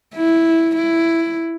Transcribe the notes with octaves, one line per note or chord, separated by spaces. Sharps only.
E4
E4